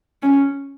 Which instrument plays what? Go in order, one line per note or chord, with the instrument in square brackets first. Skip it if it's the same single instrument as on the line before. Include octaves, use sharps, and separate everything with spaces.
[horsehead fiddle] C#4